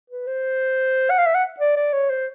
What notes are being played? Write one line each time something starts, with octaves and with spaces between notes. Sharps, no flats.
B4
C5
F#5
F5
E5
F#5
D5
D5
C#5
C5